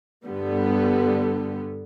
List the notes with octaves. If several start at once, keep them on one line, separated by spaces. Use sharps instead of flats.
G2 D3 G3 B3